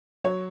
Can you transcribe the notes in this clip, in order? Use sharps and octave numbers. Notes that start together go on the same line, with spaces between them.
F#3 C#5